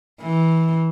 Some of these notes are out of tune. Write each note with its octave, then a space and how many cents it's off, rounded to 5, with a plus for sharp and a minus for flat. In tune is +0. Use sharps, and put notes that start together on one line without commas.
E3 -15